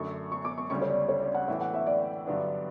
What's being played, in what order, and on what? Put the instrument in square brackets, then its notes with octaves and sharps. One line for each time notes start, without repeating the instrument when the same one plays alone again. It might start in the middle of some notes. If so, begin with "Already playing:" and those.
Already playing: [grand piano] F#2 D3 A3 [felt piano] C#6
[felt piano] C#6
D6
C#6
[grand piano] D2 C#3 G3 C#4 [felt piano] C#6
[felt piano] C#5
D5
C#5
D5
F#5
[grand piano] A2 E3 A3 [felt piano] E5
[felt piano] F#5
E5
D5
[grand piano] G2 D3 F#3 B3 D4